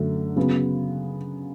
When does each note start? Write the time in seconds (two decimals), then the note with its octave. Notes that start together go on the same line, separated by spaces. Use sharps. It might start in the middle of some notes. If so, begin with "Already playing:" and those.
Already playing: F#2 D3 F#3 A3
0.37 C#3 F#3 B3